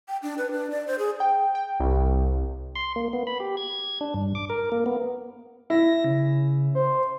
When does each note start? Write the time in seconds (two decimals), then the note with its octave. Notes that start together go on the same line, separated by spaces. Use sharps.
0.08 G5
0.22 D4
0.38 B4
0.51 D4
0.70 D5
0.87 C5
0.99 G#4
1.20 G5
1.55 G5
1.80 C2
2.75 C6
2.96 A#3
3.13 B3
3.27 B5
3.40 G4
3.57 G#6
4.01 D4
4.14 G2
4.35 D6
4.50 A#4
4.72 A#3
4.86 B3
5.70 E4 A#6
6.04 C#3
6.75 C5